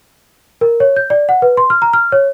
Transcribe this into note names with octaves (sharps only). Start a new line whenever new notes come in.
A#4
C#5
G6
D5
F#5
B4
C6
F6
A#5
F6
C#5